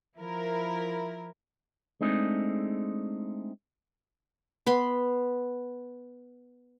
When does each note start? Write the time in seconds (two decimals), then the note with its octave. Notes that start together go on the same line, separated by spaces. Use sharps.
0.17 F3 E4 A#4
2.01 G#3 A3 C4 D4 D#4 G#4
4.66 B3 B5 C6